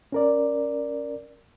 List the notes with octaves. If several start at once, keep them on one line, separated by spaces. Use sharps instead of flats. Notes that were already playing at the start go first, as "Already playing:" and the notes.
C#4 A#4 D5